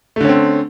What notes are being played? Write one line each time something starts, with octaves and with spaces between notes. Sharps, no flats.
D3 A3 C4 C#4